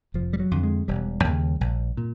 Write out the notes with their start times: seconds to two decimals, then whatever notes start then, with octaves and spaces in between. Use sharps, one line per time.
0.14 F1 F3
0.33 G3
0.40 F#3
0.51 F2 D3
0.63 G#3
0.88 E1 G3
1.25 D#2 C#3
1.61 A#1
1.97 A#2